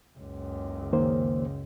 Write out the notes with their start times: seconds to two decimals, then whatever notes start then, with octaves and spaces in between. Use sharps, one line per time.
0.19 F#1 C#2
0.93 D#3 A#3 C5